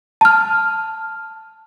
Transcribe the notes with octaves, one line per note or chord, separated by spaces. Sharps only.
A5 F6